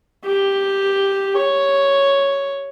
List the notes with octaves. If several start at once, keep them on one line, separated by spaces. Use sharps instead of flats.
G4
C#5